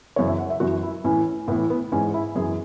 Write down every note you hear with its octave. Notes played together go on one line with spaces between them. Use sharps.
F#2 C#3 E3 C#5
E5
F#5
E5
F#2 E3 F#4
E4
A2 E3 C#4
A2 E3 B3
B3
G#2 E3 C#4
E4
F#2 E3 G#4